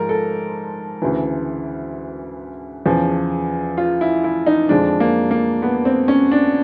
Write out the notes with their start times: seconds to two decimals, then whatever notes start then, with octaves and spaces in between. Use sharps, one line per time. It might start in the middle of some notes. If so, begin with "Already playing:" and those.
Already playing: G#2 F3 G#3 A#4
0.09 A4
1.02 D2 C#3 E3
2.85 E2 C#3 F3
3.78 F4
4.01 E4
4.24 E4
4.46 D#4
4.69 F2 D3 F3 G#3 D4
5.00 A#3
5.31 A#3
5.62 B3
5.85 C4
6.08 C#4
6.32 D4